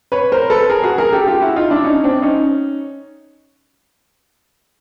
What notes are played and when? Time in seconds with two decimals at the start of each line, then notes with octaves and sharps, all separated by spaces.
0.12 B4 C#5
0.32 A#4 C5
0.50 A4 B4
0.70 G#4 A#4
0.83 F#4 G#4
0.98 G#4 A#4
1.12 G4 A4
1.27 F4 G4
1.41 E4 F#4
1.56 D#4 F4
1.70 D4 E4
1.84 C#4 D#4
2.04 C4 D4
2.22 C#4 D#4